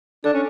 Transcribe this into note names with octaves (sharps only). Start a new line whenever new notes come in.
D4 A4
C#4